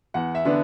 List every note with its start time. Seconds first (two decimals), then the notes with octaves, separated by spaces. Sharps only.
0.14 E2 F#5
0.35 E5
0.45 D3 B3 D4